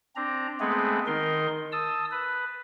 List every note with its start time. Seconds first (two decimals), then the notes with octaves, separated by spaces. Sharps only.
0.16 C4 D4 A#5
0.60 G#3 A3 B3 C4 G#4 B4
1.07 D#3 D#4 A#4 C6
1.72 A5 D#6 E6
2.11 B4